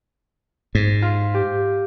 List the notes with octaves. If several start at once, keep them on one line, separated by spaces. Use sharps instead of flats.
G#2
F4
G4